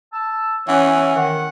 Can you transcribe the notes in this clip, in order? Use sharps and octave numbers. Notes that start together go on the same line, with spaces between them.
A5 E6
E3 C#4 F#5
D#3 F#5